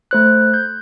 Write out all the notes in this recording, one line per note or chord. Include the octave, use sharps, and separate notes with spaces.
A3 C5 F#6
G6